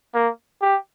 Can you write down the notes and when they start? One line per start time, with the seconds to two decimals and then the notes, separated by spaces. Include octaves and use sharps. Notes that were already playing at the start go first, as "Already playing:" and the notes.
0.14 A#3
0.62 G4